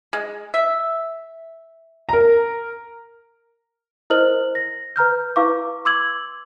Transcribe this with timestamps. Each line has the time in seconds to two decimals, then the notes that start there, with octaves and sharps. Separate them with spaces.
0.13 G#3
0.54 E5
2.09 A#4 A#5
4.10 E4 A#4 C5 D#5 F6 F#7
4.55 A#6
4.96 B4 A#5 F6 G6
5.36 E4 B4 F5 C#6 D6
5.85 C6 D6 E6 G#6 F#7